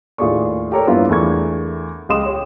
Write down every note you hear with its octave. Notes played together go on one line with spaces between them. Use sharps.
D#2 A2 F4 G#4 D5 C#6
G4 A4 A#4 C#5 D5
G2 G3 A#3 B3 E4 F4
E2 A3 D4 A#4 C#6 G#6
C#2 G4 D#5 C6 D#6 E7
G4 C#5